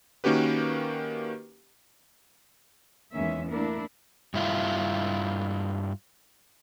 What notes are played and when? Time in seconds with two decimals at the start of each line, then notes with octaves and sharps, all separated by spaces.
0.24 D#3 A#3 C#4 F#4 G4 B4
3.13 E2 D#3 G#3 A#3 C#4 E5
3.49 A3 A#3 D4 E4 A#4
4.34 G2 E4 F4